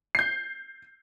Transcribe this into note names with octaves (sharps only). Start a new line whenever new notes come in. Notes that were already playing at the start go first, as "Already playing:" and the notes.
G6 C7